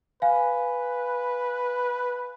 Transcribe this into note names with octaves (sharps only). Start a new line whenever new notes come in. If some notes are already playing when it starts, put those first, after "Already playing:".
B4 F5 G#5